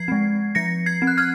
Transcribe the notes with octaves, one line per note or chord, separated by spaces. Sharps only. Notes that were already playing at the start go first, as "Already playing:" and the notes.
Already playing: F3 G#6 C7
G#3 C4
F3 A#6 C#7
G#6 C7
C4
F#6
F6 G#6